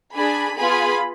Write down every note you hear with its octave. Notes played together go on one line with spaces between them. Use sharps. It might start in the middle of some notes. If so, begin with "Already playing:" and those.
D4 G#4 B5
B3 F4 G#4 B5